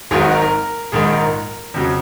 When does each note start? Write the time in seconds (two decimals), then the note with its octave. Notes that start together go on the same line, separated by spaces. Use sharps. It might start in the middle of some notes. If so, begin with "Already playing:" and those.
0.11 G#1 G#2 D#3 F#3 G#4
0.21 F#4
0.31 A#4
0.42 A#4
0.92 A#1 G#2 D#3 G#4
1.13 A#4
1.74 F2 C#3 F#3